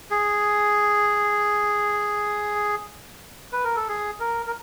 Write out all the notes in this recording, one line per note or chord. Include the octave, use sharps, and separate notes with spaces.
G#4
B4
A#4
A4
G#4
A#4
A#4